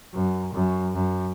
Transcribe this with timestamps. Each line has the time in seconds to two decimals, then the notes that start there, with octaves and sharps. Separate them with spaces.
0.14 F#2
0.54 F#2
0.94 F#2